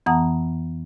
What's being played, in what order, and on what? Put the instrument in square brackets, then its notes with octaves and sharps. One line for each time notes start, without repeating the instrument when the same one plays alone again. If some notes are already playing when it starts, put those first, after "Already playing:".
[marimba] F2 E3 B3 F#5 A#5 D#6